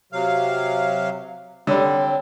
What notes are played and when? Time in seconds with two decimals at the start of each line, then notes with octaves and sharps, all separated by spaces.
0.12 C3 F#3 F5
1.67 D3 G3 C4 C#5